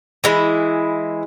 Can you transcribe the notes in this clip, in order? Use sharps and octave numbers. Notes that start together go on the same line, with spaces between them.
E3 G#3 E4